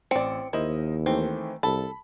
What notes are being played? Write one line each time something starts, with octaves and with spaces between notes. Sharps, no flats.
A1 C4 D5 C#7
D#2 E4 A#4 C5 D#5
D#3 E3 A3 C4
C2 A4 B5